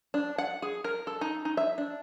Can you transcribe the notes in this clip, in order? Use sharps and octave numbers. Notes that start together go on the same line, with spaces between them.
D4
F#5
G#4
A#4
A4
D#4
D#4
E5
D4